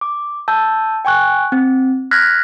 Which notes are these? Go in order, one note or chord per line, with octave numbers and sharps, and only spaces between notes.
D6
A5 E6 G6
G5 G#5 C#6 F#6
C4
F6 F#6 G#6 A#6 B6